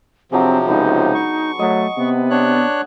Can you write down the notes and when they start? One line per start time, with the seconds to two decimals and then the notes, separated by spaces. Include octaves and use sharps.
0.32 C3 F3 F#3 C4 D4 G#4
0.68 C#2 B3 D#4
1.15 C#6
1.59 F#3 A3 D#5
1.97 C3 B3
2.30 D4 C#5 F#6